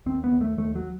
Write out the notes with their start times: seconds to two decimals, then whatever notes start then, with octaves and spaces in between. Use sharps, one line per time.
0.06 D#2 C4
0.24 B3
0.32 D#2
0.41 A3
0.57 D#2 A3
0.76 F#3